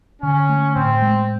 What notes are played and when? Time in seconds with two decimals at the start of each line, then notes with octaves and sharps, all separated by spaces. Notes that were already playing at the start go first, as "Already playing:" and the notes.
0.22 D3 C#4
0.49 A3
0.75 A2 C4
1.02 G#3